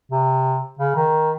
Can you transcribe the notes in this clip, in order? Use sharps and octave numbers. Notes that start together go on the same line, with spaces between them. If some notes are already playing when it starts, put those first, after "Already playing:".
C3
C#3
D#3